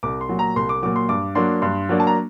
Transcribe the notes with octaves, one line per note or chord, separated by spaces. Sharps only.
C2 D6
C6
A#2 F#3
A#5
C2 C6
D6
A#2 F#3 D6
C6
G2 D6
F#3 A#3 D4 C6
G2 C6
F#3 A#3 D4
A5
A#5